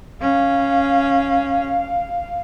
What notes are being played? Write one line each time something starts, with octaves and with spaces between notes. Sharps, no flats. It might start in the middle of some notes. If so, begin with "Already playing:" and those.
C#4 F5